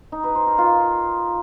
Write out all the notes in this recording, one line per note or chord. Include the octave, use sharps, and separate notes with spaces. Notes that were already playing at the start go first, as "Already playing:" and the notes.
D#4
B4
C5
A#4
F4